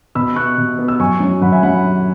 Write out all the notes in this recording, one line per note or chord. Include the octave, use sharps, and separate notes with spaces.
B2 B5 E6
B3 C#6 F#6
B2
B3
E6
F#2 G#5 C#6
F#3 C#4
F#2 F#5 B5
E5 G#5
F#3 C#4 F#5 B5